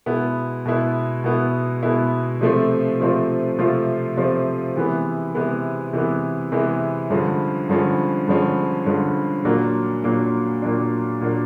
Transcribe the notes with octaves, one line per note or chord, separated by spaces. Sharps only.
B2 G#3 B3 E4
B2 G#3 B3 E4
B2 G#3 B3 E4
B2 G#3 B3 E4
C3 F3 A3 C4 F4
C3 F3 A3 C4 F4
C3 F3 A3 C4 F4
C3 F3 A3 C4 F4
C3 E3 G#3 B3
C3 E3 G#3 B3
C3 E3 G#3 B3
C3 E3 G#3 B3
G2 D3 F3 G#3 C#4
G2 D3 F3 G#3 C#4
G2 D3 F3 G#3 C#4
G2 D3 F3 G#3 C#4
A#2 F#3 A#3 D4
A#2 F#3 A#3 D4
A#2 F#3 A#3 D4
A#2 F#3 A#3 D4